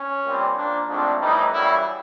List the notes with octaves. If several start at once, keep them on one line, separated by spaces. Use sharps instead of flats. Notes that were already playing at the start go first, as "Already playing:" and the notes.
Already playing: C#4
A#2 G3 C4
A#2 F3 A#3 D4
G#2 F3 A3 C4 D4
A2 E3 G3 D#4
F#2 C#3 E3 G3 E4